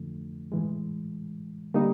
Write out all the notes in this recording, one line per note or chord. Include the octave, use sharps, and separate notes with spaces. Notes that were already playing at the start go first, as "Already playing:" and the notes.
Already playing: F2 D3 F3 A3
A2 E3 G#3
D3 G3 A#3 D#4